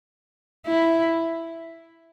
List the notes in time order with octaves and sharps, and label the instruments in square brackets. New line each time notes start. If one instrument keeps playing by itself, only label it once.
[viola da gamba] E4